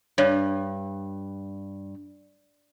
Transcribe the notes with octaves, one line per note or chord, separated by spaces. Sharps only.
G2 C#5